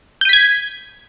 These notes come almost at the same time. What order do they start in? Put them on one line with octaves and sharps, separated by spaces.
G6 D#7 B6 G#6